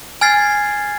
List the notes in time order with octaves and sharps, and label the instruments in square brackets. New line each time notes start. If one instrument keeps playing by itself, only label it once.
[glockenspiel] G#5 F6 G#6 A6 C7